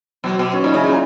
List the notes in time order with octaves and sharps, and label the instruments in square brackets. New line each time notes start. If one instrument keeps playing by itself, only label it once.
[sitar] B2 [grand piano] F#3
[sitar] B2
[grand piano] C#4
[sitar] A#2 [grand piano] D#4
[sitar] C#3 [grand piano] E4
[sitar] A#2